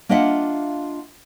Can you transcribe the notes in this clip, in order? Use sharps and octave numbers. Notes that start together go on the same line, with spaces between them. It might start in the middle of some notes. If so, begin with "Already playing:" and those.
A#3 D4 F4 D#5 E5 F#5